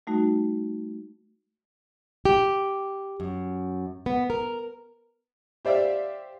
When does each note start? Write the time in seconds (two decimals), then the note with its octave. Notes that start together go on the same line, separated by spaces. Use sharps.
0.07 G3 A3 D#4 F#4
2.25 G4
3.20 F#2
4.06 B3
4.30 A#4
5.65 G4 C5 D5 E5 F5